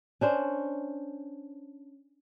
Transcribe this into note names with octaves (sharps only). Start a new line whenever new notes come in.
C#4 D4 C5